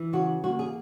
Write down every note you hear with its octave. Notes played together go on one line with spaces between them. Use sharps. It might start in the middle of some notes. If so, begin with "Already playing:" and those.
Already playing: E3
C#3 F#4
A#3 F#4
G#4